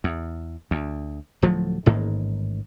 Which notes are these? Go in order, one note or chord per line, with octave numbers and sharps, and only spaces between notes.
E2
D2
D1 F3 F#3 A3
A1 G#2 D#3 A#3